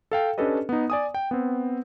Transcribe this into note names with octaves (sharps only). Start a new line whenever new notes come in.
A4 F5 G5
C#4 D4 G4 A4 B4 D#5
B3 D#4
D5 G#5 D#6
G5
B3 C4